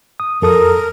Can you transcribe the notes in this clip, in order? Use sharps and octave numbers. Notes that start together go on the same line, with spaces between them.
D#6
F2 A4 A#4 D#6